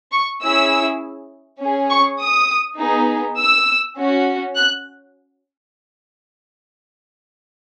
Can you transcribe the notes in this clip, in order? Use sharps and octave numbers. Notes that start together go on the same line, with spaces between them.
C#6
C#4 E4 G#4 E6
C#4 G#4
C#6
D#6
B3 D#4 G#4
E6
C#4 F#4
F#6